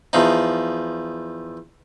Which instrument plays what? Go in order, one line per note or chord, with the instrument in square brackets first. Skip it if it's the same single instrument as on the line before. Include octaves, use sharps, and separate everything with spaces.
[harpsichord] E2 F3 D#4